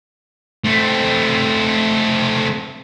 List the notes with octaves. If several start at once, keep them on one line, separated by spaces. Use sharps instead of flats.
A3 C4